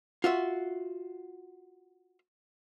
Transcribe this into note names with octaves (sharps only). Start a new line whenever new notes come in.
F4 F#4 E5